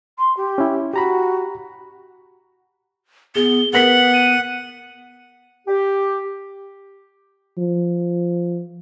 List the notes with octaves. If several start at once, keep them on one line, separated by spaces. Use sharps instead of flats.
C6
G4
C#4 E4
F#4 G4 A#5 B5
B3 G#4 G7
B3 A#4 B4 F#5 B6 F#7
D#7
G4
F3